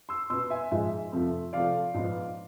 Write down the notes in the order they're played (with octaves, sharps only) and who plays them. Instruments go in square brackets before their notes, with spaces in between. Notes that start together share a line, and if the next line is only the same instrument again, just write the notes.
[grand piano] C6 E6
B2 B3 C6 E6
E5 G#5
G#2 F3 G#3 E5
F2 C3 F3 A3 C4
C3 F3 A3 D5 F5
G#2 F3 B3